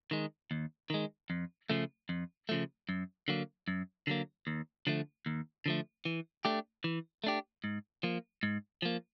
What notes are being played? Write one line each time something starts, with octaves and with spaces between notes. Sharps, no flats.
D#3 G#3
D#2
D#3 G#3
F2
C#3 F3 A3
F2
C#3 F3 A3
F#2
D3 F#3 A#3
F#2
D3 F#3 A#3
D#2
D3 F3 A3
D#2
D3 F3 A3
E3
A3 D4 G4
E3
A3 D4 G4
G#2
F3 A#3
G#2
F3 A#3